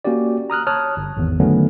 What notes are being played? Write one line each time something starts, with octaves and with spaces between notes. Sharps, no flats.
A#3 C#4 F#4 G4 D5
A#5 D#6 F6 F#6
C#5 A5 D#6 F6 F#6
G1
G#1 E2
D3 D#3 F#3 A3 B3 C#4